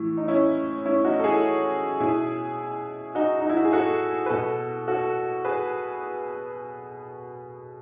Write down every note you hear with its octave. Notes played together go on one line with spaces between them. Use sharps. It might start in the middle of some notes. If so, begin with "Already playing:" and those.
Already playing: A2 E3
D#4
C#4 E4
C#4 E4
D#4 F#4
A4
E4 G#4
B2 E4 G#4
D#4 F#4
D#4
E4
F#4
G#4
F#4 A4
B4
B2 F#4 A4
F#4 A4
G#4 B4